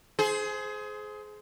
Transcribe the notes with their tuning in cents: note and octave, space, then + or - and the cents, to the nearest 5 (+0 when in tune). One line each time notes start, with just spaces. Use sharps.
G#4 +25 C5 -10